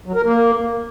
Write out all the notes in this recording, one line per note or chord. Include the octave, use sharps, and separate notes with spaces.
F#3
A#4
A#3